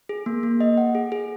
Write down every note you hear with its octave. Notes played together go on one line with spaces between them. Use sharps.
G#4
A#3
A#3
D#5
F#5
G#4
G#4